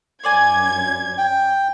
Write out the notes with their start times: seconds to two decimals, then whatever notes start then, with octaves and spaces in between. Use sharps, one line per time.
0.24 F#2 C5 D5 G#5 G#6
1.18 G5